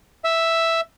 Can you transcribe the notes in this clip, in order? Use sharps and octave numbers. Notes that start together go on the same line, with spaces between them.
E5